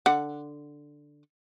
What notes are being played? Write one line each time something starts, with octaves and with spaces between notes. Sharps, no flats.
D3 F#5